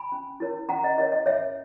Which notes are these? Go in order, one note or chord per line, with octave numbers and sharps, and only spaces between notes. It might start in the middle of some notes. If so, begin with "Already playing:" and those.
Already playing: G#5 B5
C#4
E4 A#4 C#5
C#4 F#5 A#5
D#5 F#5
E4 A#4 C#5 D#5
D#5
C#4 C#5 E5